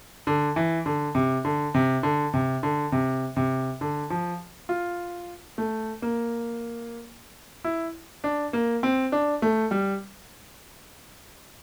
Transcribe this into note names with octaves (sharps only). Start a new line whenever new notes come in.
D3
E3
D3
C3
D3
C3
D3
C3
D3
C3
C3
D3
F3
F4
A3
A#3
E4
D4
A#3
C4
D4
A3
G3